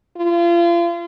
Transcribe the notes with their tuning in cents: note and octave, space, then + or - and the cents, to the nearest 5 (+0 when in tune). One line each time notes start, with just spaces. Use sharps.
F4 -35